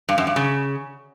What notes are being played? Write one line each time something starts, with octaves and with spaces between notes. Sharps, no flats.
G2
F#2
G2
C#3